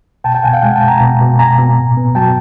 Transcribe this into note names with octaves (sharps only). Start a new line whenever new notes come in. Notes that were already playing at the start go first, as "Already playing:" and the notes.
B2 G5 A5
G5 A5
B2 F#5 G#5
F5 G5
G#3 F#5 G#5
G5 A5
B2
G#5 A#5
B2
B2
B2 G#5 A#5
B2
A2
B3
F#3 G5 A5